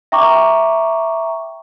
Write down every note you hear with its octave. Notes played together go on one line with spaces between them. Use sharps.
E5 G5 A#5 C#6 D6